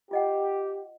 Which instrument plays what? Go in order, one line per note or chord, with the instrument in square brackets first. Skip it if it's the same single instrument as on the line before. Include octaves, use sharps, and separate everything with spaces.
[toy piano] F4 D#5 F#5 [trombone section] G4